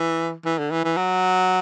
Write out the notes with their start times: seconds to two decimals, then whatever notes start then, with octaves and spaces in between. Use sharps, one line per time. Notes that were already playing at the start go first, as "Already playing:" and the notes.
Already playing: E3
0.45 E3
0.58 D3
0.71 E3
0.84 E3
0.97 F#3